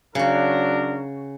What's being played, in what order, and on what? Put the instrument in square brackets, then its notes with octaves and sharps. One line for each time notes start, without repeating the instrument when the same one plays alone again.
[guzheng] C#3 F#4 [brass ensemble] F#3 D4 A#4